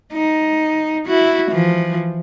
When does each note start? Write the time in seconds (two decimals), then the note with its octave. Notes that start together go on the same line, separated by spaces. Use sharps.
0.13 D#4
1.06 E4 F#4
1.52 E3 F3